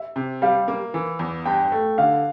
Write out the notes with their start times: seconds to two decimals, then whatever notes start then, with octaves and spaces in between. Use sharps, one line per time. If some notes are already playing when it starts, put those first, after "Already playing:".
Already playing: E5
0.16 C3
0.42 G3 F5
0.68 A#3
0.94 E3
1.19 E2
1.46 G2 G5
1.72 A3
1.98 D3 F5